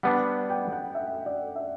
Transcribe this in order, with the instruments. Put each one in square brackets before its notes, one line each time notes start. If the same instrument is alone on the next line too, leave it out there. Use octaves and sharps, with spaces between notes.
[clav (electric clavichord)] G3 B3 D4 [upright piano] F#5
[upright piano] G5
F#5
E5
D5
E5